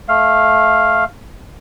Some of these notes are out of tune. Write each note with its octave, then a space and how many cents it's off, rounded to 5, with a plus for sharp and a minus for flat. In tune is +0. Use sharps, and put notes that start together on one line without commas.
A3 -15 F5 +0